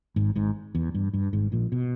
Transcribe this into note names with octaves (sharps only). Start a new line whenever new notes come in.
G#1 G#2
G#1 G#2
E2
G2
G2
G#1 G#2
A#1 A#2
B2